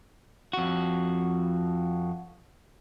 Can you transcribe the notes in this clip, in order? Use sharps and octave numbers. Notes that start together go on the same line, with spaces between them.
F2 F#4